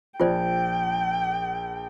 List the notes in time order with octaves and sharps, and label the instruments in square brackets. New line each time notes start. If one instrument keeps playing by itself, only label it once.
[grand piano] A#1 [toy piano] F4 C5 D5 [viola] G5